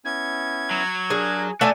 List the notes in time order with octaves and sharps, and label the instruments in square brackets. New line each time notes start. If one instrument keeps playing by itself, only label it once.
[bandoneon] B3 C#4 E4 [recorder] G#6
[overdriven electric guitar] F#3
[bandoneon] D4 A#4 F#6 [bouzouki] G#4
[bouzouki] A3 D5 G#5 [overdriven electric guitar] F#4 E5